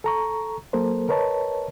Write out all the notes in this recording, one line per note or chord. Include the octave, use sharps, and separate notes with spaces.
A4 A#5 C#6
F#3 A#3 A4 A#4 C5
A#4 B4 C#5 D#5 A5